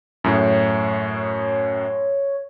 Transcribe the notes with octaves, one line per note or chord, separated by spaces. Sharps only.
F#2 A2 C#5